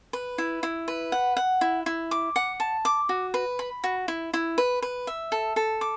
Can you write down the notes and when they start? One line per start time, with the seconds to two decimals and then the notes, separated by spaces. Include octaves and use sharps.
0.13 B4
0.38 E4
0.63 E4
0.88 B4
1.12 F#5
1.37 F#5
1.61 E4
1.86 E4
2.11 D6
2.36 F#5
2.60 A5
2.85 D6
3.09 F#4
3.34 B4
3.59 B5
3.84 F#4
4.08 E4
4.34 E4
4.58 B4
4.82 B4
5.07 E5
5.32 A4
5.56 A4
5.81 D6